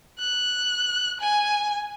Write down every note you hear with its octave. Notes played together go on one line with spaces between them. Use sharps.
F#6
G#5